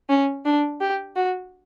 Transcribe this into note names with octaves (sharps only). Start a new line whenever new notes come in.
C#4
D4
G4
F#4